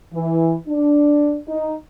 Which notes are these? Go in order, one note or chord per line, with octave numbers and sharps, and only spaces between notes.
E3
D4
D#4